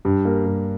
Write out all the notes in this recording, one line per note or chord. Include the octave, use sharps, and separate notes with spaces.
G2
A#3
G2